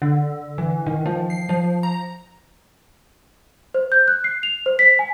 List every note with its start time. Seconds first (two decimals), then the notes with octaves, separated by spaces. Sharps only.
0.02 D3
0.58 E3
0.87 D#3
1.06 F3
1.30 C7
1.49 F3
1.83 A#5
3.74 C5
3.92 G6
4.08 F#6
4.24 C7
4.43 F7
4.66 C5
4.79 B6
4.99 G#5